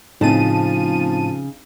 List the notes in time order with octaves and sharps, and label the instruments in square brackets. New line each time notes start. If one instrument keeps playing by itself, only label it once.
[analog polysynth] A2 A5 D#7 [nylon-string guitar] C#3 [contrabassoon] F3 [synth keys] C4 D#4